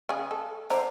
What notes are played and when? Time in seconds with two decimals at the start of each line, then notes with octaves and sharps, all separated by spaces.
0.09 C#3 G#4
0.31 A4
0.70 D3 D4 C5 A#5